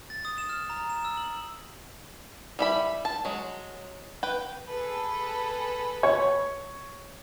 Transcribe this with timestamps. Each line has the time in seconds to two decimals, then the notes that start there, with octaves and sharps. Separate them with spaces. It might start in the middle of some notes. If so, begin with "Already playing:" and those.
0.10 A6
0.25 D#6
0.38 E7
0.49 F6
0.70 A#5
0.90 E7
1.05 E6
1.17 F#7
2.59 G3 E4 B5
3.05 A5
3.25 F#3 G#3
4.23 B4 G5
4.68 G#4 A4 B4
6.03 C#5